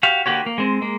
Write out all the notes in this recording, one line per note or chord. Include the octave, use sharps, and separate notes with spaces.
F#4 G4 F5
D3 A#3 F#4 G4 C#5
A#3
G#3 C4
G#3 A#3